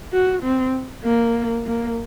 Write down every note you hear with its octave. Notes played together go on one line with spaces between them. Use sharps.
F#4
C4
A#3
A#3